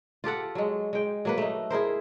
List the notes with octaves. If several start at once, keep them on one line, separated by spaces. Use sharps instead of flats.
F4 G4 A4 F#5
F#3 G#3
G#3 G5
F#3 A#3 B4
A3 D#4
E4 G#4 A#4 C5